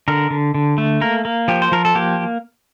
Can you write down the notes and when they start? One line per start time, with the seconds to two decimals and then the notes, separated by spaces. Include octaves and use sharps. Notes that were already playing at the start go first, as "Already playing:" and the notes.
0.08 D3 A#4
0.30 D3
0.54 D3
0.78 A3
1.01 A#3 A#4
1.25 A#3
1.48 F3 G4
1.62 C5
1.72 F3 A#4
1.85 A4
1.95 A#3 G4